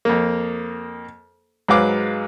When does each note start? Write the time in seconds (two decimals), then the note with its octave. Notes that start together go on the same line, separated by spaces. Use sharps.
0.05 F2 A#3
1.69 G#2 F#3 B4 F5 D6